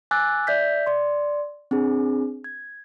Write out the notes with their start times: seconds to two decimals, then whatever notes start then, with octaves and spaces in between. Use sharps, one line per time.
0.11 G#5 D6 E6 F#6 A6
0.47 D5 E5 G6 B6
0.86 D5 C6
1.71 C4 D4 G#4
2.44 G#6